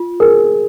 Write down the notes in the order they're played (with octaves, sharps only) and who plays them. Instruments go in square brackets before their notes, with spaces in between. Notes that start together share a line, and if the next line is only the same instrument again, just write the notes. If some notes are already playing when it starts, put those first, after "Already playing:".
Already playing: [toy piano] F4
[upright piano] G#4 [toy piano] A#4